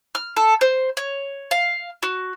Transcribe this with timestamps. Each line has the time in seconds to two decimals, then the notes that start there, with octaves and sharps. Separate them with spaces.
0.15 F6
0.37 A4
0.61 C5
0.97 C#5
1.51 F5
2.03 F#4